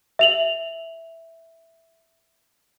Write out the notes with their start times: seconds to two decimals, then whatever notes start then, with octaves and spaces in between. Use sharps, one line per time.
0.19 E5 F7 F#7